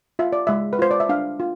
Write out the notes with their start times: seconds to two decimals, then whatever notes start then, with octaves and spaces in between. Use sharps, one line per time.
0.19 F4 E5
0.33 D5
0.47 G#3 E5
0.73 B4
0.79 F4 C5
0.91 D5
1.00 E5
1.09 D4 F5
1.40 F4